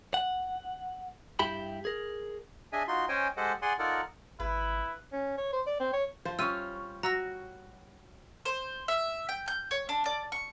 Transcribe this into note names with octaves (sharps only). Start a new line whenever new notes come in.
F#5
G2 E4 G4 G5 B5
G#4 A#4
D4 G#4 D#5 E5 G#5
D#4 F4 F#4 C6
C#4 C5 C#5 D#5 G5 G#5
G#3 G4 A4 C5 D#5 F#5
G#4 D5 F#5 G#5 C6
D#4 F4 A4 A#4 D5 F#5
G#1 E4 B4
C#4
C#5
C5
D5
C4
C#5
F3 F4 C5
G3 C#4 F4 C#5 E6 D#7
F#4 A#5 E6 A#6
C5
E5
G5
G6
C#5
D4
D5
C#6